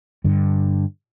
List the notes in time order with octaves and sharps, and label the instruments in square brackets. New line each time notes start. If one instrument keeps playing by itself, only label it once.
[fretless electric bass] G2 D3